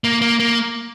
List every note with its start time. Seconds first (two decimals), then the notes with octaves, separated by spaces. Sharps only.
0.04 A#3
0.21 A#3
0.39 A#3